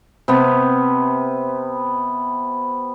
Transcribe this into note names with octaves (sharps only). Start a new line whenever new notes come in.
C3 B3